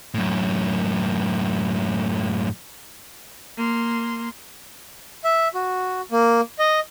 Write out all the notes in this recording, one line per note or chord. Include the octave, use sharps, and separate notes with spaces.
F#2 A2
A#3 C6
E5
F#4
A#3
D#5